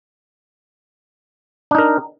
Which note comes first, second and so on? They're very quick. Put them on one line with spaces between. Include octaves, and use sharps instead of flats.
D4 D#4 A#4